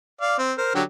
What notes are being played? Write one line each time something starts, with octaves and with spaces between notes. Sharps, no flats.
D5 F5
C4
A#4 C5
D3 F#3 G4